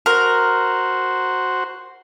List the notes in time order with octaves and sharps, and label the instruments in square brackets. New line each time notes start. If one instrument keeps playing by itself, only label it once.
[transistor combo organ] F#4 C5 [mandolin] A#4